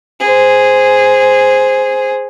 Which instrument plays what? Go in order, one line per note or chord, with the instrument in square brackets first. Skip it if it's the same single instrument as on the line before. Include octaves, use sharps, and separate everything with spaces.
[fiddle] G#4 C5